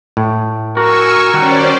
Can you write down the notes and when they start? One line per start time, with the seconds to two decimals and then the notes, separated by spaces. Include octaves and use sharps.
0.17 A2
0.77 F#4 A#4 G#5 C#6 E6
1.34 D#3 G3 C#4 F#4 C5 D5